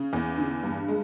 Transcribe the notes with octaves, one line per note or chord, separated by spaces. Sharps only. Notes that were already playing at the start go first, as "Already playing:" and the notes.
Already playing: C#3
E2
D3
G2
G#3